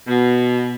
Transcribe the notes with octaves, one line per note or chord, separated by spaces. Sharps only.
B2